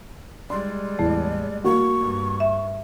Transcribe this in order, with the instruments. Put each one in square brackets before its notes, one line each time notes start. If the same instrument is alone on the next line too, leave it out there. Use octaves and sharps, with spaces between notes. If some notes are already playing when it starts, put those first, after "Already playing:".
[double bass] G3 G#3 [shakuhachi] D5 [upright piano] C6
[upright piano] E2 A2 [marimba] A3
[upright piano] A#3 F#4 [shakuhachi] C#6
[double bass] G2
[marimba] E5